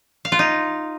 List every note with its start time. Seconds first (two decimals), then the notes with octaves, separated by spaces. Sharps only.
0.25 F5
0.32 F4
0.39 D#4